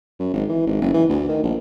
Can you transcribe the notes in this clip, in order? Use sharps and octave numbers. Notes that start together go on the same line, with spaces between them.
F#2
G#1
E3
G#1
F#1
E3
D2
D#3
A#1